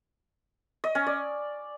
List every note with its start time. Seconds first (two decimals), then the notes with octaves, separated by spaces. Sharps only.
0.84 D#5
0.95 C#4
1.06 D5